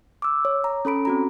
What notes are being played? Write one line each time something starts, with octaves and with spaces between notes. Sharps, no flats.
D6 E6
C#5
A#5
C#4 A4 B5 D7
C4 F#4 A#5